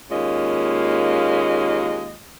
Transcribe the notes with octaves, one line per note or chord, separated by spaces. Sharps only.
D#2 G#3 A#3 C#4 F4 D#5